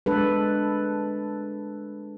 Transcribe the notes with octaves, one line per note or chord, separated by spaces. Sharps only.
G#3 D4 A4 B4